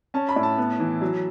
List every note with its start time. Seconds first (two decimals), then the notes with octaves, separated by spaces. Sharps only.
0.14 C#4 A5
0.29 B5
0.36 A2
0.43 A5
0.58 B3
0.80 E3
1.01 F#3